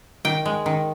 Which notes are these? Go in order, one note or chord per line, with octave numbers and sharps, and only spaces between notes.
D#3 G5
G#3
D#3